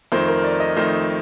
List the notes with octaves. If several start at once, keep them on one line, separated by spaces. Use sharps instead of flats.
F2 D#3 A3 C5
A#4
D5
D#5
F2 D#3 A3 C5